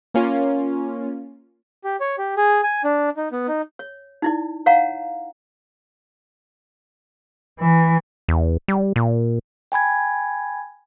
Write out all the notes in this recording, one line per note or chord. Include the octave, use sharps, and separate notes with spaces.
A#3 C#4 F4
G4
C#5
G4
G#4
G#5
D4
D#4
B3
D#4
C#5
D#4 E4 D5
C#5 F5 F#5 A#5
E3
E2
G3
A#2
G5 G#5 B5 G#6